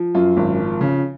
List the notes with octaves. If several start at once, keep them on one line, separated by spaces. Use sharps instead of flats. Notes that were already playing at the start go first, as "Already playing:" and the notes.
Already playing: F3
F#2 F4
G#1
F3
C#3